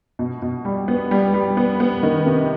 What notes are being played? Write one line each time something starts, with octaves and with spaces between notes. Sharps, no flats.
B2
B2
G3
B3
G3
G3
B3
B3
D#3
C3